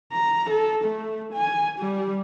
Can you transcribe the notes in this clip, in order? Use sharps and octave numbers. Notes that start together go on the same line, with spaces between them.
A#5
A4
A3
G#5
G3